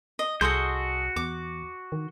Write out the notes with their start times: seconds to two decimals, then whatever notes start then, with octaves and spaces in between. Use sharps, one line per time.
0.19 D#5
0.41 C2 F#4 G#4 A4 D#5 C6 G6
1.16 E2 D6
1.92 D#3